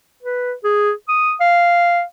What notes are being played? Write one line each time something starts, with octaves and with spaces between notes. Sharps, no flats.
B4
G#4
D#6
F5